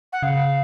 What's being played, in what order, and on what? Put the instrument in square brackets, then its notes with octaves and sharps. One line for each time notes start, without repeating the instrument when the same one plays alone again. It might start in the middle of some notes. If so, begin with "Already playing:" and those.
[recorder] F#5
[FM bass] C#3 [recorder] F5